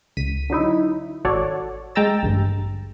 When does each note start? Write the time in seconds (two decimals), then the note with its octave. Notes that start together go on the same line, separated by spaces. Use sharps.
0.17 C#2 B6 D#7
0.50 D3 F#3 D#4 E4
1.24 G#1 F#4 A4 C#5 D5
1.95 G#3 G5 A#5 E6 A6
2.23 A1 D2 G2